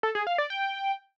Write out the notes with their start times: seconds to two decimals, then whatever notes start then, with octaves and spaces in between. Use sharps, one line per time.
0.03 A4
0.15 G#4
0.27 F5
0.38 D5
0.50 G5